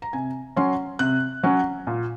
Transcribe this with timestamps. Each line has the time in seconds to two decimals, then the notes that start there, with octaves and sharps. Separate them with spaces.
0.02 A#5
0.13 C3 G#5
0.56 F#3 C#4 C6
0.99 C3 F#6
1.43 F#3 C#4
1.87 A#2